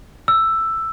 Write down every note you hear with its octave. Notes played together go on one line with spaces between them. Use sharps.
E6